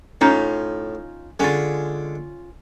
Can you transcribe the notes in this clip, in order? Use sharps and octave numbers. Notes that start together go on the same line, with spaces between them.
A2 C#4 D#4 F4
D3 G#3 C#4 F4